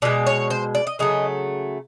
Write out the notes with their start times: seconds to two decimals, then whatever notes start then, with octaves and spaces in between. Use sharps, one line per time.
0.02 B2 G#3 D5
0.27 C#5
0.50 C5
0.75 D5
0.87 D#5
0.99 C#3 F#3 A3 D#5